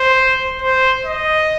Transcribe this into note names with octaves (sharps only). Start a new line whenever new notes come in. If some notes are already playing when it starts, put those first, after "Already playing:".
Already playing: C5
C5
D#5